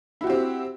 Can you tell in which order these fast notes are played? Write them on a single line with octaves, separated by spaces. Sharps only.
E4 F#4 G4 C4